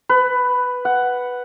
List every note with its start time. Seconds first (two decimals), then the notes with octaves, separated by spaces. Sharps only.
0.09 B4
0.85 F#5